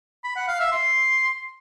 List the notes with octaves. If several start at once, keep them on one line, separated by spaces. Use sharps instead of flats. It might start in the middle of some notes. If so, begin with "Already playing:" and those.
B5
F#5
F5
E5
C6